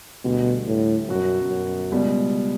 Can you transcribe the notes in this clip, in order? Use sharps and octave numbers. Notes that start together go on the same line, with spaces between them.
D2 B2 D3 G3
A2
F#2 B2 F#3 B3 F#4
F#2
C#2 B2 G3 B3